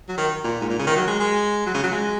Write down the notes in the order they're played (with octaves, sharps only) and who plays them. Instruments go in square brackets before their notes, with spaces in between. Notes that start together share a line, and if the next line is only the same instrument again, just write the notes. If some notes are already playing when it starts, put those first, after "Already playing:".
[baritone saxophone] F#3
D#3
A#2
G#2
A#2
C#3
D#3
F#3
G#3
G#3
F#3
C#3
F#3
G#3